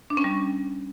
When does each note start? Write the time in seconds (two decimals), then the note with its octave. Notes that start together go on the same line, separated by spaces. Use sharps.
0.10 D4
0.17 C#4
0.24 G3